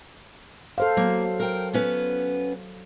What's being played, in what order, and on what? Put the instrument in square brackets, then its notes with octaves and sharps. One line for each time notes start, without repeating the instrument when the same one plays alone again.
[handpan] A4 C5 F5
[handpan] F#3 [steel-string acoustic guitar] A#3
[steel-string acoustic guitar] A#4 G5
B3 C#4 B4